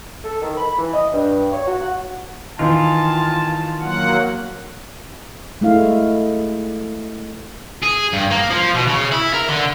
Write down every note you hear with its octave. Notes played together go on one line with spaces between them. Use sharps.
A4
D#3
B5
E3
D#5
G2
C#5
F#4
F#5
D#3 E3 F4 A5
F#3 A#3 F#5
G#3 A3 E4 F5
G#4
G2
A#3
F3
B2
C#3
E4
A#4
D3